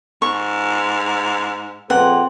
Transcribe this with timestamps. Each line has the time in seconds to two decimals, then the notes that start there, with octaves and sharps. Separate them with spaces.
0.22 G#2 C#6
1.90 F2 A#2 C4 G#4 B4 F#5